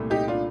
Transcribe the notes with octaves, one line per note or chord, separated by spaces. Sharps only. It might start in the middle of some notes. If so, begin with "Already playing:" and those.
Already playing: C2 A#2 A3
D#4 G4
D4 F4